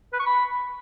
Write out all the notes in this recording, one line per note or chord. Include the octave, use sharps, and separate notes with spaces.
B4
C#6
B5